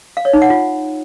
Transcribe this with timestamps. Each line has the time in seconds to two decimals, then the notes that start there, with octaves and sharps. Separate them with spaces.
0.17 F5
0.25 C#5
0.33 D#4
0.42 F#5
0.50 F4